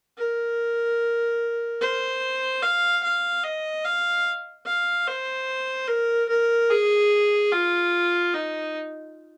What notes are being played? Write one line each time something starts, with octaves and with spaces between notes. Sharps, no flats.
A#4
C5
F5
F5
D#5
F5
F5
C5
A#4
A#4
G#4
F4
D#4